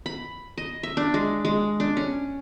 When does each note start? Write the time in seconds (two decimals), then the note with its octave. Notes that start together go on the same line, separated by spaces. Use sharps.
0.06 B5
0.58 D#5
0.83 E5
0.97 D4
1.14 G#3
1.45 G#3
1.80 D4
1.97 C#4